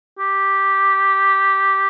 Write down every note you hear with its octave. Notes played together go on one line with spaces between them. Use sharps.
G4